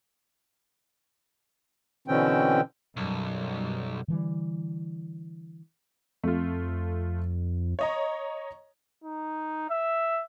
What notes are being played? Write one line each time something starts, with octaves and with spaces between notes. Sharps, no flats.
B2 D3 E3 C4 C#4 G5
B1 F#2 G3
D3 E3 G3
F2 A3 F4
C#5 D#5 A#5
D#4
E5